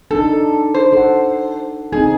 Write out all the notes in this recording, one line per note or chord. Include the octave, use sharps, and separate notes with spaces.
D4 D#4 A4
C5
A4 F#5
C4 D#4 G#4